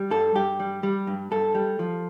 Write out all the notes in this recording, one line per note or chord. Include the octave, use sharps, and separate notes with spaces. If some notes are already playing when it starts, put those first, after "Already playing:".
Already playing: G3
G2 A4
G2 G4
G3
G3
G2
G2 A4
G3
F3